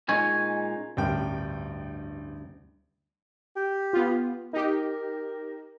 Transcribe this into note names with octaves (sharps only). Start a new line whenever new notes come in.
A#2 G#3 C#4 D#4 C#5 G#5
A1 D2 G2 A#4 G5
G4
B3 F4
D#4 G4 A#4